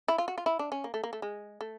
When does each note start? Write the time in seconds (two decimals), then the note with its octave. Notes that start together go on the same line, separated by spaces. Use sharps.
0.08 E4
0.18 F4
0.28 F#4
0.38 F4
0.46 E4
0.59 D4
0.72 C#4
0.84 A#3
0.94 A3
1.04 A#3
1.13 A3
1.22 G#3
1.61 A3